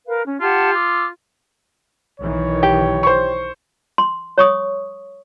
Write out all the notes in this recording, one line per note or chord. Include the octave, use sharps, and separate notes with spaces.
A#4 B4 F5
C#4
F4 G4 F#5 A5
D6 E6
B1 D#3 E3 C#5
G4
C5 C#6
C6
C#5 C#6 D#6